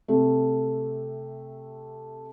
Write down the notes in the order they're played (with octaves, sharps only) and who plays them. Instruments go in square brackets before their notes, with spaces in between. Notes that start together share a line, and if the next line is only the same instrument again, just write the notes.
[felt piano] C3 A3